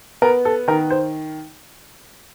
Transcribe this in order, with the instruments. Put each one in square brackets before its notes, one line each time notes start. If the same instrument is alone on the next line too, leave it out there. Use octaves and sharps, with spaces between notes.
[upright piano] B3 A#4
A4
D#3 A#4
C5